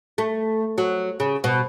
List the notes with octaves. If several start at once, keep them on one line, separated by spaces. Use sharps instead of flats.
A3
F#3
C#3
B2